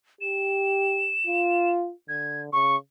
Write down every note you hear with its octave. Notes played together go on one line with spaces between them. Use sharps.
G4 E7
F4
D3 G#6
C#3 C#6